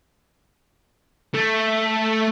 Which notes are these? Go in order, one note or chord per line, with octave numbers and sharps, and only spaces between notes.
A3